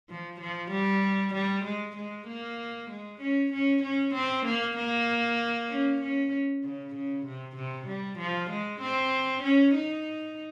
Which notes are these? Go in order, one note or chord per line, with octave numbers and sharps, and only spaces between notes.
F3
F3
G3
G3
G#3
G#3
A#3
G#3
C#4
C#4
C#4
C4
A#3
A#3
C#4
C#4
C#3
C#3
C3
C3
G3
F3
G#3
C4
C#4
D#4